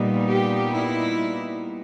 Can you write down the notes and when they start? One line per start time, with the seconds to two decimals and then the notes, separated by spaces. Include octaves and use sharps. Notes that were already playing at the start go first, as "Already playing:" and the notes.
Already playing: A#2 G3 B3 D#4
0.29 G4
0.73 E4